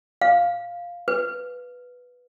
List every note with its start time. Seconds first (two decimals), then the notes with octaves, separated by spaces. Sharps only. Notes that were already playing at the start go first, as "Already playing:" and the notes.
0.22 F5
1.08 B4